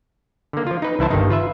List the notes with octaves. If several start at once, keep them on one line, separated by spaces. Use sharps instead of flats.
D3 A#3
F3 F4
D#4 B4
C2 E3 E4 C5 A5
G1 G2 D#3 D#4
F4 B4 E5